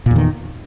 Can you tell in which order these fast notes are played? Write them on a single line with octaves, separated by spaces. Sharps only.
A#2 E2 D#3